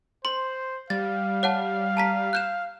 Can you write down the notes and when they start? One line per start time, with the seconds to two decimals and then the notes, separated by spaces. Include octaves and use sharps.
0.25 C5 C6
0.90 G3 F5 A6
1.43 C#5 F#5 A5
1.97 A5 A#5 B6
2.33 F#6 G6 E7